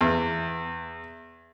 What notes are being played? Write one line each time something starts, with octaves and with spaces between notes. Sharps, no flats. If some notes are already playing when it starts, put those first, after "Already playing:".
E2